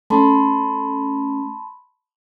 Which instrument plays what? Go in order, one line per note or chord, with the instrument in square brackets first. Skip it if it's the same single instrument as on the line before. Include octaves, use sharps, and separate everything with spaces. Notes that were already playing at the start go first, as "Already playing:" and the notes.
[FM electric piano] A3 C#4 [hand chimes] A5 B5 C6